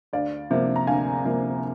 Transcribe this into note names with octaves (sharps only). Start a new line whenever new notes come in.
D2 D5 F5
C3 F3 A#3
A#5
D2 F5 G#5
C3 F3 A#3